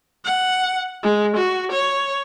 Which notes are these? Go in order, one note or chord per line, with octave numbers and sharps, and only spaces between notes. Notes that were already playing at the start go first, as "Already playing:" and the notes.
F#5
G#3
F#4
C#5